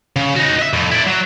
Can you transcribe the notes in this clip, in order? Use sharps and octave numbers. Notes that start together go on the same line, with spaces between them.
C#3
D#4 F#4
D#5 E5
F2 A2
E4 D5
F#3